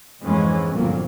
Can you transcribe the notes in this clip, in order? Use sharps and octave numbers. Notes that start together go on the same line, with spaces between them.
F2 G#2 E3 G#3 C#4
G1 F2 A#2 F#3 A#3